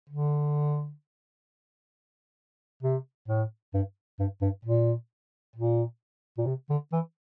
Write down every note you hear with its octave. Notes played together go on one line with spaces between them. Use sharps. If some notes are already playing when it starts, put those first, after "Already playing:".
D3
C3
A2
G2
G2
G2
A#2
A#2
A#2
C3
D3
E3